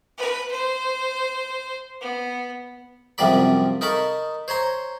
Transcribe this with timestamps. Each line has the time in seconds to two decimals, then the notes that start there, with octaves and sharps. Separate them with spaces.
0.18 B4
0.51 C5
2.01 B3
3.18 C2 F#2 C3 F3 D5 B5
3.81 D#4 A#4 A5 B5 C#6
4.48 C5 C#5 A#5 C6